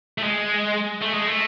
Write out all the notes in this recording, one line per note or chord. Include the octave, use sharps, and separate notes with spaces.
A3
G#3
A3
G#3
A3